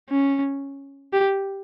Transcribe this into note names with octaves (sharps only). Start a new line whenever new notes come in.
C#4
G4